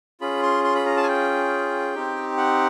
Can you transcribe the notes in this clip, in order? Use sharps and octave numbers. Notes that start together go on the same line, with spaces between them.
C#4 F4 G#4 B5
C6
C6
B5
A#5
A5
G#5
G5
C4 D#4 G4
F#5